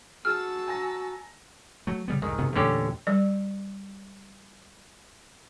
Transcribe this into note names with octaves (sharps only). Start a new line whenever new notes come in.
F#4 G#4 A5 E6 F6
G#5 A#5 A#6
F#3 A3
C#3 G3 B3
C2 F2 G#2 D#3
F#1 C3 B3
E2 A#2 D3 A3 C#4 G4
G3 D5